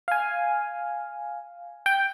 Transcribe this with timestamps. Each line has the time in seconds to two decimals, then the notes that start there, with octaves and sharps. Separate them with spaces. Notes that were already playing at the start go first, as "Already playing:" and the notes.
0.08 F5 G#5
1.86 G5